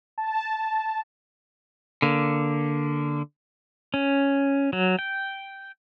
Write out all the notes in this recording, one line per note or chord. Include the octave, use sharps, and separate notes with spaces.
A5
D3 A#3
C#4
F#3
G5